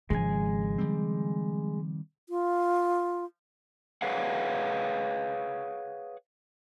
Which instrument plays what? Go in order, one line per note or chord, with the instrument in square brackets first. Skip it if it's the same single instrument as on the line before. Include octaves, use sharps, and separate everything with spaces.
[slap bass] G#1 [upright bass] C#3 F3 [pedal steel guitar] G#3 G#5
[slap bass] D#3 G3 C4
[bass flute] F4
[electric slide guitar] G#4 B4 C#5 F5 F#5